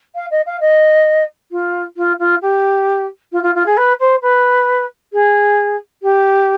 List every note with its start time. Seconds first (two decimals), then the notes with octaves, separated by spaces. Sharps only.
0.15 F5
0.31 D#5
0.46 F5
0.60 D#5
1.51 F4
1.97 F4
2.19 F4
2.42 G4
3.32 F4
3.43 F4
3.55 F4
3.66 G#4
3.77 B4
4.00 C5
4.22 B4
5.13 G#4
6.03 G4